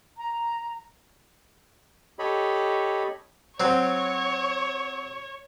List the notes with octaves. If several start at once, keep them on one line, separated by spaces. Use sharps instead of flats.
A#5
G4 A4 C#5 D#5 B5
F#3 C4 C#5